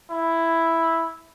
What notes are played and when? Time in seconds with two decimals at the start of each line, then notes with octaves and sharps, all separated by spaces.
0.10 E4